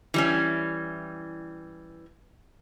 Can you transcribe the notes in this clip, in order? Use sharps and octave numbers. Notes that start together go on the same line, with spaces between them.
E3 G3 C#4